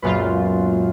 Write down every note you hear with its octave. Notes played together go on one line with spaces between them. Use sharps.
C#2 F#2 A#2 B3 F4 B4